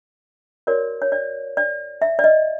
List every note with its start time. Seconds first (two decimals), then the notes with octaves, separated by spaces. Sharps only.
0.67 F#4 A#4 C#5 D5
1.02 C#5
1.12 D5
1.57 D5
2.02 E5
2.19 D5
2.24 D#5